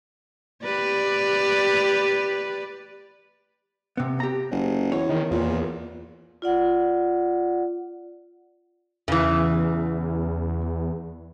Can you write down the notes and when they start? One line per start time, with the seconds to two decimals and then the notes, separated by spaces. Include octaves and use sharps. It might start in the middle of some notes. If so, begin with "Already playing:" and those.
0.63 G4 B4 D5
3.97 C3 B3
4.20 G4 A#5
4.51 F#1
4.92 E2 C#5
5.09 D#3
5.31 E2 A#2
6.42 F4 D5 F#5
9.08 E2 C#3 E3